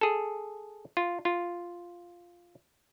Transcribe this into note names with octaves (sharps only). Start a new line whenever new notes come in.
G#4 A4
F4
F4